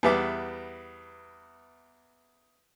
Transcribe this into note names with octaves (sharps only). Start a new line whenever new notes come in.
E2 G3 B3 E5 D6